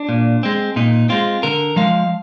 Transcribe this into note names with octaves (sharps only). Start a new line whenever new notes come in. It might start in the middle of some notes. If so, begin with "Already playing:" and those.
Already playing: D4
A#2
G#3 C4
A#2 D#4
G#3 C4 F4
D3 A#4
F3 G#3 F5